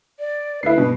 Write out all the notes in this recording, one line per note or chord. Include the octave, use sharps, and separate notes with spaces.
D5
D2 E4 B4 C7
G2 B2